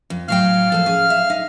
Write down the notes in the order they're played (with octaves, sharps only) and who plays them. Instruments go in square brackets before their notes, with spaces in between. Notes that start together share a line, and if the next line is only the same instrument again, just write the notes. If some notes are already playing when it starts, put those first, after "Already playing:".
[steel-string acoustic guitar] F2
[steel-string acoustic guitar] A2 F#3 G5 [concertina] F5 F6
[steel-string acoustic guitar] F3 A4
C#4 G#4
E5
D#4